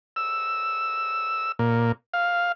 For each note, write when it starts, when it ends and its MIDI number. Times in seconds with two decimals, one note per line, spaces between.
0.16 1.52 88
1.59 1.92 46
2.14 2.52 77